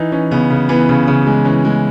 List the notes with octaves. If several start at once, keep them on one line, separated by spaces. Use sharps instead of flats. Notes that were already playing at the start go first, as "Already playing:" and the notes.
Already playing: E3 D#4
E3 C#4
C#3 B3
C#3
E3 B3
C#3
C#3
G#3
E3 C#4
G#3